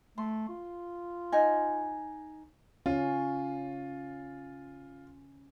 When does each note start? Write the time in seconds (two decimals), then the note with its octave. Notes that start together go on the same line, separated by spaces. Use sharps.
0.18 A3 C6
0.49 F4
1.32 D#4 G#5
2.86 C#4 F4